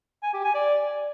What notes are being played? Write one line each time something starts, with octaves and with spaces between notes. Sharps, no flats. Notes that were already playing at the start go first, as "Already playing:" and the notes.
G#5
G4
G#5
D5